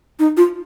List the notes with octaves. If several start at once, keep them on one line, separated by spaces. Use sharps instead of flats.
D#4
F4